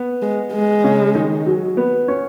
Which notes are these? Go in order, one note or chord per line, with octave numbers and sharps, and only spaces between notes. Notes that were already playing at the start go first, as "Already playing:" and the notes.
Already playing: B3
G#3
G#3
C#3 C#4
D#3 D#4
F#3 F#4
B3 B4
C#4 C#5